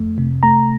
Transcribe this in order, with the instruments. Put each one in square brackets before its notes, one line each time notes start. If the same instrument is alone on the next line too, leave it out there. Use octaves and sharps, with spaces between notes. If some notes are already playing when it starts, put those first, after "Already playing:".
Already playing: [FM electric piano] F2 A3
C3
A3 A#5